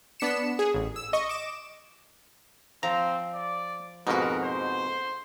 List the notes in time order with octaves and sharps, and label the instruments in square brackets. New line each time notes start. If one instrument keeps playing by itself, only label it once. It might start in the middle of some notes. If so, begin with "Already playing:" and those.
[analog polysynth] B3 D4 B6 C#7 E7
G#4
A1
E6
D#5 C#6
D6 E7
[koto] F3 [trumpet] C4 [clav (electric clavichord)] A#5
[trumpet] D5
[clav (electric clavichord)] F2 G#2 B2 [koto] D#4 F#4 [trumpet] A#4
[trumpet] C5